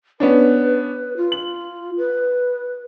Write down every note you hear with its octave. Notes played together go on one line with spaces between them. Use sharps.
B3 C#4 D4 B4
F4
F#7
B4